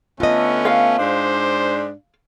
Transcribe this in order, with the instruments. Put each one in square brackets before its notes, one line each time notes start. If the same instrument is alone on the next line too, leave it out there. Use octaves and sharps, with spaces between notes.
[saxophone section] D3 A3 B3 [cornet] C#4 [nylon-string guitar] F4 D#5
[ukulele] F5
[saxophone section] G#2 D4 [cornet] C5